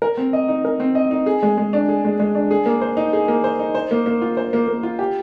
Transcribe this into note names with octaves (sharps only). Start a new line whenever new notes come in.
A#4
C4
D#5
D#4
A#4
C4
D#5
D#4
G#4
G#3
G#3
D4
G#4
G#3
G#3
D4
G#4
A#3
C5
D#4
G#4
A#3
C5
D#4
C5
A#3
A#3
F4
C5
A#3
A#3
F4
G4